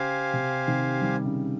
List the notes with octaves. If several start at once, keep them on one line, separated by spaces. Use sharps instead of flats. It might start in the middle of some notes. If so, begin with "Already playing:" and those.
Already playing: C#3 G4 C5 F5 G#5
C3
C3 D#3
D#3 G3
C#3